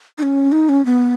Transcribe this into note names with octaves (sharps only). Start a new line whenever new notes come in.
D#4
C#4
D#4
C#4
B3